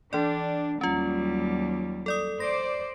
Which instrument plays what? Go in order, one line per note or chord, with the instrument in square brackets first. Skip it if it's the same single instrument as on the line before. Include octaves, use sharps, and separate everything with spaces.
[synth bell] E3 D5 [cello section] D4
[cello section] D#2 F#3 G3 [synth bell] C#4 F4
[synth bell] A4 D5 D#6
[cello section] C5 D5 [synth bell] A#6